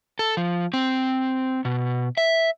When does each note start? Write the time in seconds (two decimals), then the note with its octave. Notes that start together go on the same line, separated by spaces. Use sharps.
0.19 A4
0.37 F3
0.74 C4
1.65 B2
2.17 E5